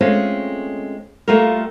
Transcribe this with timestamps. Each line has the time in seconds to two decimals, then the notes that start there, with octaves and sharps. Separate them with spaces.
0.01 G#3 A3 C4 C#4 F4
1.28 G3 A3 A#3 F4 F#4 A#4